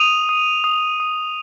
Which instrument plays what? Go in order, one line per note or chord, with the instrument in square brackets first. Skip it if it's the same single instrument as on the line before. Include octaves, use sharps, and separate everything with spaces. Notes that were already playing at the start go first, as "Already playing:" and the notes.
Already playing: [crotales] D#6 D#7 F7
D#6
D#6
D#6